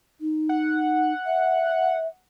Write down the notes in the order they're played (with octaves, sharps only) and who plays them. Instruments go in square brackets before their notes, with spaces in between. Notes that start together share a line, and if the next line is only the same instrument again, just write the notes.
[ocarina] D#4
[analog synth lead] F#5
[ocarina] E5